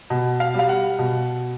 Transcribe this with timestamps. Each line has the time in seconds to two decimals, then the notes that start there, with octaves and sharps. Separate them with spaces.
0.10 B2
0.40 F5
0.54 G3 F5
0.69 F#5
0.99 B2